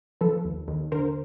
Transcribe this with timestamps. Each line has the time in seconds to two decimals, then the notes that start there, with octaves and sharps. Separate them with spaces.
0.21 F3 A4 B4
0.45 D#2
0.68 D#2
0.92 D3 A#4 C5